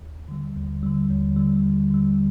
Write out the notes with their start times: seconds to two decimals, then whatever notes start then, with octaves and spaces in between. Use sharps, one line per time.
0.01 D#2
0.28 D3 G3
0.56 D#2
0.83 D3 G3
1.10 D#2
1.36 D3 G3
1.64 D#2
1.91 D3 G3